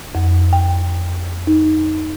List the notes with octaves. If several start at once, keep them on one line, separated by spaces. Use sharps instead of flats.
F2
G5
D#4